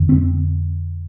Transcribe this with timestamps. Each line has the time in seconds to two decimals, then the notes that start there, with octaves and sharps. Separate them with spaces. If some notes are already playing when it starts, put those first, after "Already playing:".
Already playing: F2 D3
0.09 C4